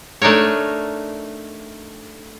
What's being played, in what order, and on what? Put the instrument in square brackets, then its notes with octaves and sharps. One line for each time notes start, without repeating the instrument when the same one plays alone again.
[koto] A3 D4 D#4 A#4 C#5